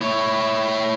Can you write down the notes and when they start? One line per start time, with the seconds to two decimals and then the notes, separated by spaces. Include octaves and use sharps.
0.01 E4 C#5